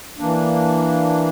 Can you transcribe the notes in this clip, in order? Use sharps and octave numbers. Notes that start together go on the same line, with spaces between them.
E3 A#3 D4